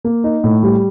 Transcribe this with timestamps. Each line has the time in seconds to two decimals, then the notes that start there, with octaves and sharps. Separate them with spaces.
0.04 A#3
0.24 D#4
0.44 A2
0.63 G3